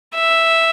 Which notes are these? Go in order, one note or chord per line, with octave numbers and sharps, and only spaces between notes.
E5